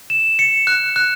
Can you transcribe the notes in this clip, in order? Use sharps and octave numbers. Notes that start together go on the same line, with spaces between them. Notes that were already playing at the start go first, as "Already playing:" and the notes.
E7
C#7
F#6
F#6